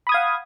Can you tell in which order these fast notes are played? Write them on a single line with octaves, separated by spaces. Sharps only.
B5 D#6 G#6 F5 F#5